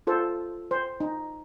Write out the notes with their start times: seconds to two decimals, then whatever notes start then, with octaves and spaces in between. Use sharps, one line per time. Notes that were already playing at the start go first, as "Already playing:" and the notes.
0.07 F4 A4 C5
0.71 C5
1.00 D#4